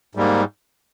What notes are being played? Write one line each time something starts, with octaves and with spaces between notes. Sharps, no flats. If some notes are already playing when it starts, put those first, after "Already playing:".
G#2 G3 A#3